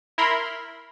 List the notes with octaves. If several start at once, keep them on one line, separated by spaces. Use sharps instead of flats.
E4 A#4 B5 C6